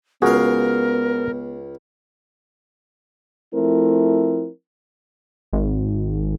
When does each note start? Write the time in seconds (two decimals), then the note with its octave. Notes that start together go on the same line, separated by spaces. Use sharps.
0.22 C#2 B3 F#4 G#4 A#4 F5
3.54 F3 A3 C4 E4 A#4
5.53 G#1